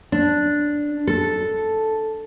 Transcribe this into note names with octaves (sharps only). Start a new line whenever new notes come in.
D4
A4